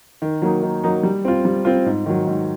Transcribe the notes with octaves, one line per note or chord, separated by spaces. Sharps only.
D#3
F#3 A#3 D#4
D#3
F#3 A#3 D#4
G3
C4 F4
G3
C4 F4
G#2
D#3 F#3
G#2